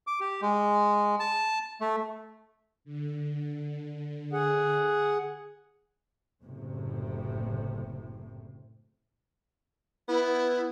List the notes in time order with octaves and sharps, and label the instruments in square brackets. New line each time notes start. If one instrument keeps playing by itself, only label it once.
[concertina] D6
G4
G#3
A5
A3
[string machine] D3
[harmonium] G#4 F#5
[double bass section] F#1 A2 C3
[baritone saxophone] B3 [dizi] E4